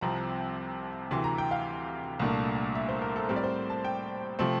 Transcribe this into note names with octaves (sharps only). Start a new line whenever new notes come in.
C2 C3 F3 C4 A#5
D2 C3 E3 C6
A#5
G5
F5
C2 A#2 A3 D4
E5
C5
A#4
A4
A2 G3 C4 A#4
D5
C5
A5
G5
C3 F3 A3 C4